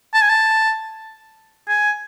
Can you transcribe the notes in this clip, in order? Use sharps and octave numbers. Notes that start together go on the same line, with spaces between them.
A5
G#5
A5
G#5